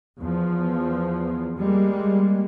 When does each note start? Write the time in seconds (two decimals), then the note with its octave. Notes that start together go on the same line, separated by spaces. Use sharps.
0.19 E2 F3
1.59 G3 G#3 A#3